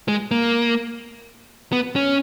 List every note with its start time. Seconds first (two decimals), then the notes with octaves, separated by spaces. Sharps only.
0.08 G#3
0.31 A#3
1.72 B3
1.96 C#4